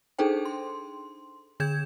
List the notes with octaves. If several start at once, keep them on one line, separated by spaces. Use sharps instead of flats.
D4 D#4 G#4 A4 C5 G5
C6
D3 G#4 G6 G#6 E7